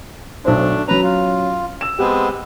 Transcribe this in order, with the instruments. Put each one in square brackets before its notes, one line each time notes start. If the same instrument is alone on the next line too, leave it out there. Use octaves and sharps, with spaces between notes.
[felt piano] B1 C5 [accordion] A3 D4
[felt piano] F#3 C#4 [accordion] B4 A#5
[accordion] F4
[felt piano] E6 E7
[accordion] G#3 B3 C4 [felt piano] G4